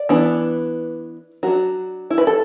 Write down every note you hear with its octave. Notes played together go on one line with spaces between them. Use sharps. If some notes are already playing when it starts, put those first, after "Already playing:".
Already playing: D5
E3 B3 D4
F#3 D4 F#4
E4
B4
A4